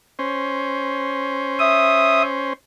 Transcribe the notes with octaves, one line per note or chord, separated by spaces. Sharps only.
C#4 C5
E5 D#6